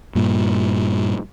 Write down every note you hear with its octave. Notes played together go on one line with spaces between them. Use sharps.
G2 A#2